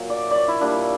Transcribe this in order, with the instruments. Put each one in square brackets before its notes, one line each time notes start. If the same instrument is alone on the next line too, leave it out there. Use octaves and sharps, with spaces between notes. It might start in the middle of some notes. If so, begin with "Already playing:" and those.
Already playing: [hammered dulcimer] A#2 F#3
D5
E5
C#5 D5
E4
A#2 G3 D4